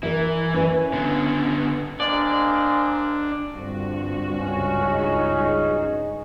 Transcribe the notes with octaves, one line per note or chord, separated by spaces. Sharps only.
E3 A#4 E5
C#4 B4 E5
D3 B3
G#3 A#3 C4 D4 D5
G2 D3 F3 C4 F#4
C#2 C#4
D#4 G#4